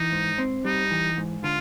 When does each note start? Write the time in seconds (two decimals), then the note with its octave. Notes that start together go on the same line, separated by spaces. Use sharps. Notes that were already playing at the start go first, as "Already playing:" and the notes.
Already playing: E3 D#4
0.12 G#2
0.38 C4
0.65 G3 D#4
0.91 E3
1.17 G#2
1.44 D3 F4